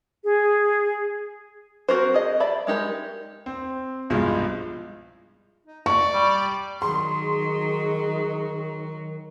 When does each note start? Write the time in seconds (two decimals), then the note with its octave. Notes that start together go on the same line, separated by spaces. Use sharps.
0.24 G#4
1.89 C4 F#4 A#4 C5
2.14 G#4 D#5
2.40 D5 E5 B5
2.67 G#3 D#4 G4 A#4
3.46 C4
4.10 C2 G2 B2 F3 G#3
5.66 D#4
5.86 D5 C#6
6.14 G3
6.82 D#3 F#3 G#4 C6